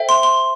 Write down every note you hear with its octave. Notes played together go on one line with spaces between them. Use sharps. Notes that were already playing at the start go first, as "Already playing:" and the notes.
Already playing: A4 C5 E5 G5
C6
C6